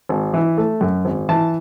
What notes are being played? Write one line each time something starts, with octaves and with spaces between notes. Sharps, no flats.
G#1
E3
A3
F#2
G#1
E3 A5